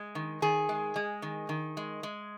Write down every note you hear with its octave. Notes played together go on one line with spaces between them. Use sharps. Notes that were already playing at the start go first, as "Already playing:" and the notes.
Already playing: G#3
D#3
D#3 G#4
G#3
G#3
D#3
D#3
G#3
G#3